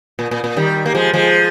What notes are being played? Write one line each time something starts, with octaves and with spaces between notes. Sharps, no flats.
A#2
A#2
A#2
D#3 G3
A#3
F3 G#3
F3 G#3